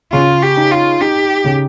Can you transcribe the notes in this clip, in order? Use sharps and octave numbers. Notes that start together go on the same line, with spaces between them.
C#3 F4
G4
D#4
F4
D#4 G4
C#3